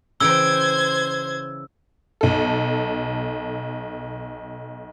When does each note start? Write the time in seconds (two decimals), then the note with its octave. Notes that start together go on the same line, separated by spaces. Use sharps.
0.20 C#3 E3 C5 G5 E6 G#6
2.21 B1 A4